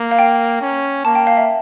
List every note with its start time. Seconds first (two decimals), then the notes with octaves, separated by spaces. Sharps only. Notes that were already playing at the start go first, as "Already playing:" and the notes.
Already playing: A#3
0.11 F5
0.19 G5
0.61 C#4
1.05 A#3 A5
1.15 G5
1.27 F5
1.37 E5